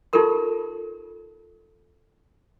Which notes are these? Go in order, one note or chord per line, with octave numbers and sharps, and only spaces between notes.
D#4 F4 G4 A4 A#4 C6